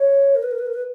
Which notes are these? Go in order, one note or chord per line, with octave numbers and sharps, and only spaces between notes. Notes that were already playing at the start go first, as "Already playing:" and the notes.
Already playing: C#5
A#4
B4
A#4
B4
A#4
B4